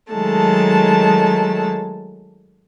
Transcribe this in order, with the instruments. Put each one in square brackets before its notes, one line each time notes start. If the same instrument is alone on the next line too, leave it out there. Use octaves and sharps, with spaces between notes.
[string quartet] D#3 F#3 G#3 A3 A5